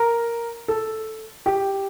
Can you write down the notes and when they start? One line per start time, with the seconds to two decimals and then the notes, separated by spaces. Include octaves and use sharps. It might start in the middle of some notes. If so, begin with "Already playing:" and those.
Already playing: A#4
0.68 A4
1.46 G4